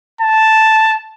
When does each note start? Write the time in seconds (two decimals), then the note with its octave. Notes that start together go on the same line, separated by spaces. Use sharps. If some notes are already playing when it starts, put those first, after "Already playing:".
0.21 A5